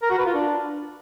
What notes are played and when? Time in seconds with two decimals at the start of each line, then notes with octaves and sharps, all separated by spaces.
0.02 A#4
0.10 F#4
0.18 B4
0.26 F4
0.34 D4